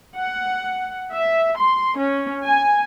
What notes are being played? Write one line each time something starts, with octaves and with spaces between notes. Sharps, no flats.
F#5
E5
C6
C#4
G#5